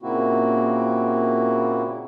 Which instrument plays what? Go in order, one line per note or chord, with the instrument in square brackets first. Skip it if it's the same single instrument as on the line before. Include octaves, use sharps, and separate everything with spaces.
[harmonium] A#2 C#3 A#3 C4 E4 F#4